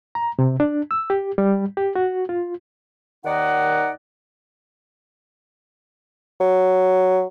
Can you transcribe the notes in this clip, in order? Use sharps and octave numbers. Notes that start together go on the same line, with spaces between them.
A#5
C3
D4
E6
G4
G3
G4
F#4
F4
D#2 D#3 D#4 D5 D#5 F#5
F#3